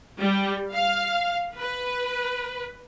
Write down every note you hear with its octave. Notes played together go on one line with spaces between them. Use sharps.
G3
F5
B4